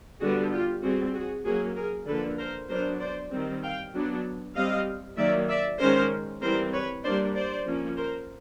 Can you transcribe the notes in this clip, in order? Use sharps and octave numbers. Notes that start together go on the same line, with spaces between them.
D3 G3 B3 D4 F#4 G#4
F4 G4
G3 C4 F#4 G#4
F#4 G#4
F#3 A#3 C#4 F#4 G#4
G#4 A#4
D3 F3 A#3 A4 B4
A#4 C5
F#3 B3 D4 A#4 C5
C5 D5
D#3 G3 C4
F5 G5
F#3 B3 D4
G3 C4 D#5 F5
D#3 F#3 A#3 D5 E5
D5 E5
D#3 G#3 C#4 A#4 C5
E3 G3 C4 A#4 C5
B4 C#5
G3 A#3 D4 C5 D5
C5 D5
F3 A#3 C#4
A#4 C5